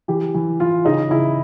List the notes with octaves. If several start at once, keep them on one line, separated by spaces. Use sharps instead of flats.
E3 G4
E3
E3 F4
C#3 D#4
C#3 E4